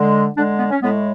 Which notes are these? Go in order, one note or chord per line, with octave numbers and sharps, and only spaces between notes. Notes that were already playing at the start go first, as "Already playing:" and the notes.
Already playing: D3 G#3
D3 G#3 D4
B3
C#4
A2 G#3 B3